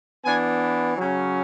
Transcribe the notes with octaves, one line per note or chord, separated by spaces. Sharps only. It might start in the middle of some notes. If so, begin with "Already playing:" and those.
E3 B3 D4 G#5
C#3 F#3 C#4